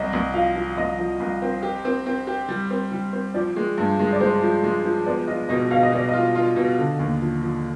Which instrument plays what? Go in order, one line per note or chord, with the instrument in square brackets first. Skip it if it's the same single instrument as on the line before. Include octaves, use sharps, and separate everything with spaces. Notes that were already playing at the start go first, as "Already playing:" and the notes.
Already playing: [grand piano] C2 [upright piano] D#5
[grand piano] C2
[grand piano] F3 [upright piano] F5
[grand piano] F3
[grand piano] C2 [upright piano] D#5
[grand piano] F3
C2
C4
G4
C4
C4
G4
G3
C4
G3
C4
[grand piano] F3 [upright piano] D5
[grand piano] G#3
G2
G#3
[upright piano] D5
[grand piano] G#3 [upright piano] C5
[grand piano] F3
G#3
F3
[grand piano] B3 [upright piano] D5
[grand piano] F4 [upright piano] D#5
[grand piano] B2 [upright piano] D#5
[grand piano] B2 [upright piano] F5
[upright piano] D#5
[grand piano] B2 [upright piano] D5
[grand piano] F4 [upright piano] D#5
[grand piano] F4
B2
D3
D#2
F3
F3